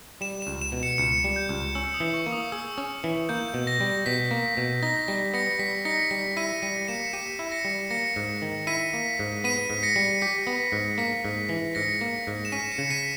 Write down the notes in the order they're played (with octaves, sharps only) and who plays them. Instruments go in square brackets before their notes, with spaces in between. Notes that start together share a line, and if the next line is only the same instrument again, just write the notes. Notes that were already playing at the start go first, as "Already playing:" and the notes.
[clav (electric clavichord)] G3 [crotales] E7
[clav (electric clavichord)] C#2 [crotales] E7
[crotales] E7
[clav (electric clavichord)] B2
[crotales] C#7 E7
[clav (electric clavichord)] C#2 [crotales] C#7 E7
[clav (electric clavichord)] G3
[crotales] G6
[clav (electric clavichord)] C#2
[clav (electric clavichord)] C#4 [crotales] E6
[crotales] D#6
[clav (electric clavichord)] E3
[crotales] C#6
[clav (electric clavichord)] A#3
[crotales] D#6
[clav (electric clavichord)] G#4 [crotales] E6
[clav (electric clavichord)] C#4
E3
[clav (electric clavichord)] A#3 [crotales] G6
[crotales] G6
[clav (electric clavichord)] B2
[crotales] A#6
[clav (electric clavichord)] G3
[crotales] A#6
[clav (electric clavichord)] B2 [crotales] B6
[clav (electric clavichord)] A#3
B2
[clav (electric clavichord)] D#4 [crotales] A#6
[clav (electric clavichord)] G3 [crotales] A#6
[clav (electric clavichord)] B3 [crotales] A#6 C#7
[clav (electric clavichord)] G3 [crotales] B6
[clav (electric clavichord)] D#4 [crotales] A#6 C#7
[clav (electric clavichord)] G3 [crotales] B6
[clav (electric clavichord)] E4 [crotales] B6 D#7
[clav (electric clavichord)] G3 [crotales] B6 D#7
[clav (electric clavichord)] A#3 [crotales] C#7 E7
[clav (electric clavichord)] G4 [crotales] B6 D#7
[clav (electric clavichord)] E4
[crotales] A#6 C#7
[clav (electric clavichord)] G3
[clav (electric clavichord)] A#3 [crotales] A#6 C#7
[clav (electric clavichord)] G#2
D#3
[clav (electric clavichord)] E4 [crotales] B6 D#7
[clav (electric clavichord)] A#3
G#2
[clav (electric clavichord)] B3 [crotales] B6 D#7
[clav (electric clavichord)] G#2
[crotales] A#6 C#7
[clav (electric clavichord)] G3
[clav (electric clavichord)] G4 [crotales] B6
[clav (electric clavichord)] B3
G#2
[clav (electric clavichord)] A#3 [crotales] B6
[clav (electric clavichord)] G#2
E3
[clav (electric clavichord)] G#2 [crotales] A#6 C#7
[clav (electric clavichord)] A#3
G#2
[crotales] E7
[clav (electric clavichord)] C#4 [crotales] B6 D#7
[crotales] C#7 E7
[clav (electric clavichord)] C#3
[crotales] B6 D#7